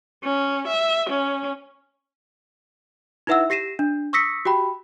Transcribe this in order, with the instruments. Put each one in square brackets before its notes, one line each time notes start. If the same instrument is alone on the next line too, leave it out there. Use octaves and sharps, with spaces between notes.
[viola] C#4
E5
C#4
[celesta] D#4 E4 B4 E5 F#5 E6
G4 A#6 C7 D#7 E7
D4
C#6 D#6 E6 A#6 B6 C#7
F#4 G4 G5 B5